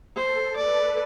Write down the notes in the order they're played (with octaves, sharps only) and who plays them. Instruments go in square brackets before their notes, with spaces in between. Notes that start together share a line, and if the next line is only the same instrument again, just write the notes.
[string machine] A4 [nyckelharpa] C5
[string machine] B4 [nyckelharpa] D5